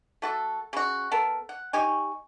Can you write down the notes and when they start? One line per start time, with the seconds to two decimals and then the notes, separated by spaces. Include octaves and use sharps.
0.22 A3 F#4 A4
0.73 C#3 F#4
1.11 B3 A4 A#4
1.49 F#5
1.73 D#4 G4 G#5 C#6